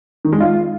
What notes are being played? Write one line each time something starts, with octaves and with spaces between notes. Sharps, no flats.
D#3
G#3
F4